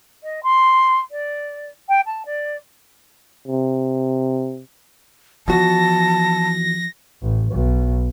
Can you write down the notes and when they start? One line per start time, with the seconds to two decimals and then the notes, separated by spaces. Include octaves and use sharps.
0.23 D#5
0.43 C6
1.11 D5
1.88 G5
2.05 A5
2.25 D5
3.48 C3
5.48 E2 F3 F#4 A5 A#6
7.22 A1
7.52 B1